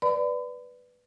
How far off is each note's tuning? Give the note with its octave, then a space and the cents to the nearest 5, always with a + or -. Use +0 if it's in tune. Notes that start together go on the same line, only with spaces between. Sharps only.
B4 +0 D5 +0 B5 +40